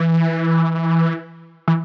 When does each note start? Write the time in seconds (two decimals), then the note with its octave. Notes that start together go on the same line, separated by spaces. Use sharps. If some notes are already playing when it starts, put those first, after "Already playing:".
Already playing: E3
1.68 E3